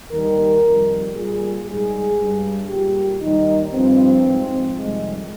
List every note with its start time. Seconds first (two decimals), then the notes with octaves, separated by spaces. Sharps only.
0.11 D#2 D#3 G3 A#4
0.64 F2 D#3 G3
1.15 A#2 G3 G#4
1.66 G#2 G3 G#4
2.18 G2 G3
2.69 A#2 G3 G4
3.22 D#2 D#3 G3 D#4
3.73 G2 F3 C4
4.25 G#2 F3
4.76 F2 C3 D#3 G3 G#3